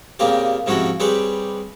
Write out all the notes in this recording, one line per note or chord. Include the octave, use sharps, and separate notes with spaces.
A#2 C#3 A#3 C4 G4
G#2 C3 F3 C#4 E4 F#4
G3 C4 G4 G#4 B4 C#5